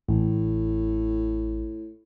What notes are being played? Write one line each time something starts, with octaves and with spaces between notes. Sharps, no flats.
A1 A2